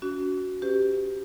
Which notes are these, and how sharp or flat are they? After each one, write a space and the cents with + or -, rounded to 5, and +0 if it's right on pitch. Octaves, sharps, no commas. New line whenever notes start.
C#4 +45 F#4 +0
C#4 +0 G4 +0 C5 -45